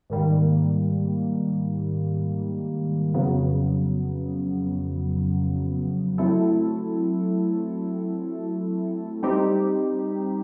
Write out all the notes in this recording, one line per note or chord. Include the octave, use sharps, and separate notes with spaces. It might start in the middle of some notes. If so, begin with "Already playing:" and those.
G#2 D#3 G3 A#3
F2 C#3 F#3 B3
F#3 A3 C4 E4 A4
G3 C4 D#4 G4